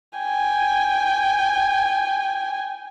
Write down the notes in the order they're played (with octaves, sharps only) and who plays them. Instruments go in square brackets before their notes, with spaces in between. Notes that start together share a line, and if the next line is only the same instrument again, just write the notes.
[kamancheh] G5 G#5